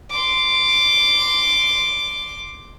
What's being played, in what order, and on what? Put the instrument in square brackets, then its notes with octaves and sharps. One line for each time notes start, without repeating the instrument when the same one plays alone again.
[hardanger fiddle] C6 D6